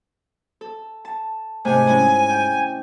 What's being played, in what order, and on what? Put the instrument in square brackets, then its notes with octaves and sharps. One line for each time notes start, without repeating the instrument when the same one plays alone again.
[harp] A4
A5
[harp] G#2 C3 A3 [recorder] G#5
[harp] G#3 C#4 E4
G5